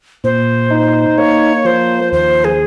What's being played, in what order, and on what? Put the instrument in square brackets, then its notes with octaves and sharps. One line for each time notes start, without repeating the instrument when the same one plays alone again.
[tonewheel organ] A#2 [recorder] C5
[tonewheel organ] D#4
[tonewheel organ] A#3 [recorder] C#5
[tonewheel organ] F3 [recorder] C5
[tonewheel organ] D#2 [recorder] C5
[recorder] G#4